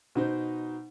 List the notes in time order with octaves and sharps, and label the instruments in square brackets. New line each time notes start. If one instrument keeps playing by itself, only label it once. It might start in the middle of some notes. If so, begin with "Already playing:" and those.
[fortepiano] B2 D#4 C5